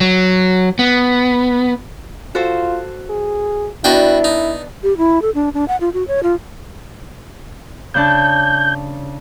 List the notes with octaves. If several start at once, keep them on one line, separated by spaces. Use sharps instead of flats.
F#3
B3
F4 F#4 A4 C5
G#4
B3 D4 E4 F#4 D#5 G5
D#4
G4
E4
A4
D4
D4
F#5
F4
F#4
C#5
F4
C#3 D4 A5 G6